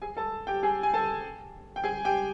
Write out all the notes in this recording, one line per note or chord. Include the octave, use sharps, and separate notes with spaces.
G#4 G#5
A4 A5
G4 G5
G#4 G#5
G#5
A4 A5
G5
G#4 G#5
G4 G5